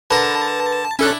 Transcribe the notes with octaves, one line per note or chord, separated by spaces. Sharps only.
D3 A#4 B4 A5
C#4 D4 E4 A4 F#6